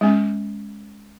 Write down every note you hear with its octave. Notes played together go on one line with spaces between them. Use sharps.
G#3 C#4